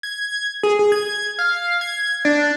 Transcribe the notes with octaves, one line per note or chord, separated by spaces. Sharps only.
G#6
G#4
G#4
G#6
F5
G#6
D4